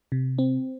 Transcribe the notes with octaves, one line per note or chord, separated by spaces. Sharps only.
C3
C4